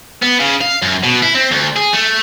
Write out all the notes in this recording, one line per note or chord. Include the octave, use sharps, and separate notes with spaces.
B3
C#3
F5
F#2
B2
E4
C4
D2
G#4
A3